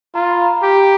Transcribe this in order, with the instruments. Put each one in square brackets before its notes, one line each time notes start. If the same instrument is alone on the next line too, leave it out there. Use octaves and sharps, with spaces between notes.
[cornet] F4 [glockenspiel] A#5
[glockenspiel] B5
B5
A#5
[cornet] G4